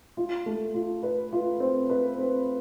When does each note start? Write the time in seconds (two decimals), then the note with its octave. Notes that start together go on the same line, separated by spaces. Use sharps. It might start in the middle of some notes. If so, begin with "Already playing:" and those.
0.17 F4
0.46 A3
0.74 F4
1.03 B4
1.33 F4
1.60 C4
1.90 B4
2.18 C4